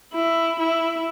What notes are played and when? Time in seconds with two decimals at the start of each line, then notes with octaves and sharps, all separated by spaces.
0.14 E4
0.59 E4